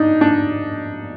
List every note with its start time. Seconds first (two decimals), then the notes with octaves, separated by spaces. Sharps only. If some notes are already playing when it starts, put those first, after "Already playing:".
Already playing: D4 D#4
0.21 D4